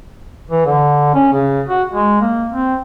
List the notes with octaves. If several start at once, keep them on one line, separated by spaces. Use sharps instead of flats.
E3
D3
C#4
C#3
F#4
G#3
A#3
C4